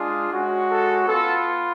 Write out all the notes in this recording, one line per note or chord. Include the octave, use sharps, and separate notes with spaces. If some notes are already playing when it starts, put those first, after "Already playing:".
Already playing: G#3 D4 F4 G#4
G#3 C#4 F#4
A4
B3 F4 A4